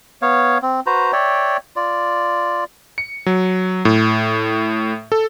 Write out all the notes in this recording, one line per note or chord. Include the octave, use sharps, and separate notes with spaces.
B3 C#5 F5
C4
F#4 B4 C5 A#5
C#5 D5 E5 G5
F4 D5
C#7
F#3
A2
A4